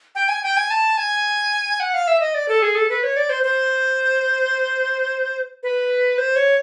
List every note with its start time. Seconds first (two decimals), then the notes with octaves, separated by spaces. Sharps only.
0.15 G5
0.28 G#5
0.43 G5
0.57 G#5
0.70 A5
0.97 G#5
1.80 F#5
1.94 F5
2.07 E5
2.20 D#5
2.34 D5
2.49 A4
2.62 G#4
2.75 A4
2.89 B4
3.03 C#5
3.17 D5
3.30 C5
3.43 C5
5.63 B4
6.18 C5
6.36 C#5